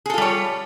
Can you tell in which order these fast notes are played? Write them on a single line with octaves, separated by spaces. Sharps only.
G#4 A4 F4 G3 C#5